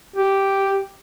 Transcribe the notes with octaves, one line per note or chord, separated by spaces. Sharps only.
G4